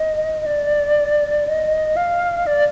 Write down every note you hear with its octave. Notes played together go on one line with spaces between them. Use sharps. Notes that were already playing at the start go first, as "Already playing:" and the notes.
Already playing: D#5
D5
D#5
F5
D5